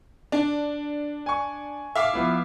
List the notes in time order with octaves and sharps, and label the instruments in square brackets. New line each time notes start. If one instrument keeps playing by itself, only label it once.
[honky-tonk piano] D4
[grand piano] G#5 C#6
[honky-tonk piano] E5 F5 D6
[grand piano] F3 B3 E4